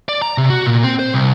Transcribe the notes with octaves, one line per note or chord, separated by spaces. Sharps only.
D5
A#5
C3
F#4
A#2
C4
C5
C2